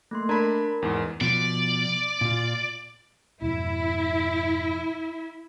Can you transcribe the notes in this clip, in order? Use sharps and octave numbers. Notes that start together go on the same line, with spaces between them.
A3 A#3 C6
D4 A#4 A#5 B5 G#6
E2 G#2
B2 F3 D5
A#2 F4
F2 G#2 B2 E4